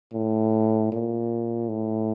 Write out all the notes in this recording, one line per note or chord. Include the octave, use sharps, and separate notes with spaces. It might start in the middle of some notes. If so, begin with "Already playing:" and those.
A2
A#2
A2